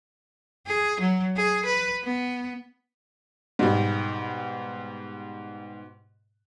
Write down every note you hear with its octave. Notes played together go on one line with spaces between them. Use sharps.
G#4
F#3
G#4
B4
B3
G#2 B2 G3